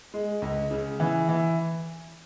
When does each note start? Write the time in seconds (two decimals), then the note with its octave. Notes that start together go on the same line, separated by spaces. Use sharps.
0.14 G#3
0.42 C#2
0.71 C#3
1.00 E3
1.28 E3